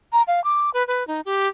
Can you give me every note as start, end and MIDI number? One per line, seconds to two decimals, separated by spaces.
0.13 0.22 82
0.28 0.43 77
0.44 0.70 86
0.74 0.85 71
0.87 1.06 71
1.08 1.21 63
1.26 1.48 67